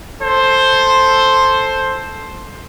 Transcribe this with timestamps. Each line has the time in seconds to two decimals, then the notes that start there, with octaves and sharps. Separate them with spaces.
0.22 A4 C5